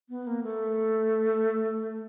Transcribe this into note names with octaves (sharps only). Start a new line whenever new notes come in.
B3
A#3
A3